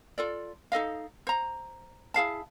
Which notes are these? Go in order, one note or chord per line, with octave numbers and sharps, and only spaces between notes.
F4 A4 D5
D#4 A4 D#5 F5
C5 A#5
E4 G#4 F5 A5